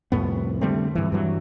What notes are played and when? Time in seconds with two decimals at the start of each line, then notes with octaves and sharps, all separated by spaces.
0.12 C2 F2 A2 B3
0.61 D3 G3 A3 C4
0.95 G2 E3
1.12 G2 E3 F#3